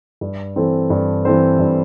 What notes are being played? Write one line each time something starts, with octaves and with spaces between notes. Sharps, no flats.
G2
E3 C4 A4 C5
G2
E3 C4 A4 C5
G2